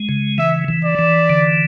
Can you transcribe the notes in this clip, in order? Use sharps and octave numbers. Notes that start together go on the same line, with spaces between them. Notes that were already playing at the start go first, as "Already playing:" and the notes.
Already playing: G#3
C#3
E3 E5
E3
D5
E3
D3